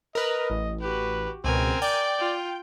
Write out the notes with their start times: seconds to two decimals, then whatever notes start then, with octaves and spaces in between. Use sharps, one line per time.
0.15 A#4 B4 D#5
0.50 A1
0.81 F#4 G4 B4
1.44 C#2 B2 C4 A#4 G#5
1.82 D5 G5
2.20 F4